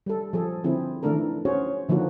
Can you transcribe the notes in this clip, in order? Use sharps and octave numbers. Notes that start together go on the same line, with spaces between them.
G3 A4
F3 G#4 A4
D3 F3 C4 E4 G#4
D#3 E3 A3 D4 A4 A#4
C#4 F#4 G#4 C5 C#5
D3 F3 A#3 D#4 F#4